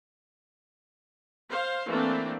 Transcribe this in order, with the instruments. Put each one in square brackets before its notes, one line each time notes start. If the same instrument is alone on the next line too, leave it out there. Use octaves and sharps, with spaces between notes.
[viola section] C5 F5
E3 A3 A#3 C4 D4